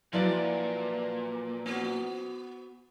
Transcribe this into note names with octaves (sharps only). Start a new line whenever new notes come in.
A#2 F3 F#3 E4 B4 D5
B3 F#4